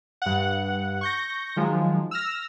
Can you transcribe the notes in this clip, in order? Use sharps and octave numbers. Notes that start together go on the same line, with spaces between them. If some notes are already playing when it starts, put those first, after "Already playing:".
G2 F#5
C#6 G6 A#6
D#3 F3 F#3 G#3
E6 F6 A#6